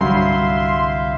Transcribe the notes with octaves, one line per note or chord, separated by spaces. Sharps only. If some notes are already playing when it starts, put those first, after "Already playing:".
C2 G2 D3 E3 F#3 E5 F5 C6